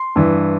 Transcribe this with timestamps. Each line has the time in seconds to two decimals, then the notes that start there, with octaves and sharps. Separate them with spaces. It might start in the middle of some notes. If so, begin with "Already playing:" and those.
Already playing: C6
0.16 G2 E3